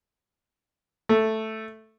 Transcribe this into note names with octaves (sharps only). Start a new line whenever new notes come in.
A3